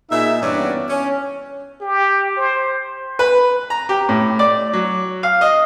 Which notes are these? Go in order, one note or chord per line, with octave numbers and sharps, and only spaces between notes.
A#2 D#4 G#4 E5
G2 E3 B3 C#4 F#4 D5
C#4
G4
C5
B4
A#5
G4
A2
D5
F#3
F5
D#5